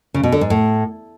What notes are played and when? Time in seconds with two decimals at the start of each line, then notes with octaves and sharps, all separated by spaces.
0.14 C#3
0.23 B2
0.32 D3
0.41 G#2
0.50 A2